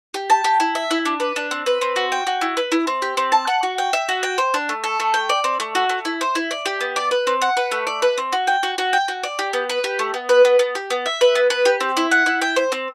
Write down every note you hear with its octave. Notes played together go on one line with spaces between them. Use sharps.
G4
A5
G4
E4
E5
E4
D4
B4
D4
C4
B4
C4
F#4
G5
F#4
E4
B4
E4
C4
G4
C4
A5
F#5
F#4
G5
E5
F#4
G5
C5
D4
A3
A4
A3
G5
D5
C4
A3
F#4
A3
E4
C5
E4
D5
G4
B3
D5
B4
C4
F#5
B4
A3
D5
B4
C4
F#4
G5
F#4
F#4
G5
F#4
D5
G4
B3
B4
G4
A3
B3
B4
B3
B3
G4
B3
E5
B4
B3
B4
G4
C4
E4
F#5
E4
G5
C5
C4